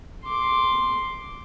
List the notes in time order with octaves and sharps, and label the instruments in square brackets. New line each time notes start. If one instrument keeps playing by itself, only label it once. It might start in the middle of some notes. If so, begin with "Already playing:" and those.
[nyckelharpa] C6 D6